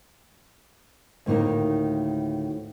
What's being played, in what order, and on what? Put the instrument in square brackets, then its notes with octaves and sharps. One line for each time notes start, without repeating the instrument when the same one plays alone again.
[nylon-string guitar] D2 A2 D#3 A#3 D#4